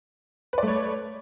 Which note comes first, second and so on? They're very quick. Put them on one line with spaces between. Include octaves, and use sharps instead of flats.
B4 D5 A3 C#5